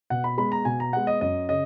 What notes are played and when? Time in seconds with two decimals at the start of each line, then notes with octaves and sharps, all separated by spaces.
0.10 B2 F#5
0.24 B5
0.38 G#3 B3 B5
0.52 A#5
0.65 B2 G#5
0.80 A#5
0.93 G#3 B3 F#5
1.07 D#5
1.21 F#2 D#5
1.49 C#3 D#5